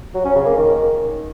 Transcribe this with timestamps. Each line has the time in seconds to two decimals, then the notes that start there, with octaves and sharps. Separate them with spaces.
0.15 F#3
0.25 C#4
0.35 C#3
0.46 A#3
0.56 D#3